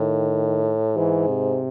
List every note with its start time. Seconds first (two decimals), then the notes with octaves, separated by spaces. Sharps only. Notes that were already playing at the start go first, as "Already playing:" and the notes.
Already playing: A2 D#3
0.96 G#2 E3
1.29 C3